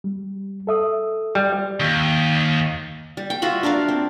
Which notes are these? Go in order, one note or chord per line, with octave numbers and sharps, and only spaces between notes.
G3
A4 E5 D#6
G3
D#2
G3
G5
F4 F#4 E5 B5
D4 A#4 D5 F5
C4